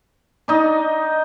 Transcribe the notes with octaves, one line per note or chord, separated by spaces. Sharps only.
D4 D#4 D#5